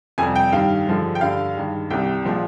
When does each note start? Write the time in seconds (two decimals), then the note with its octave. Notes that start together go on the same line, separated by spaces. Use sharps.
0.18 F2 C3 G3 G#5
0.36 G5
0.53 G2 D#3 G3 F5
0.87 G2 D3 F3 G#3
1.15 G5
1.21 G2 D3 G3 F5
1.56 G2 D#3 G#3
1.90 C2 C3 G3 G5
2.25 A#2 F3 G#3